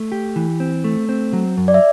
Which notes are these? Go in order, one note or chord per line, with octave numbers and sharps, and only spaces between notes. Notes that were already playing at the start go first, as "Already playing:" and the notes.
Already playing: A3
G4
E3
C4
A3
C4
F#3
F#2
D5
E5